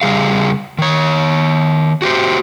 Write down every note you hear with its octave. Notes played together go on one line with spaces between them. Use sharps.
C#3 G3 G#4 F5
D#3 C#5
F#4 G4 C5